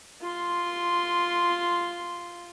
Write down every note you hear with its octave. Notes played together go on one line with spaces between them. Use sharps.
F4 C6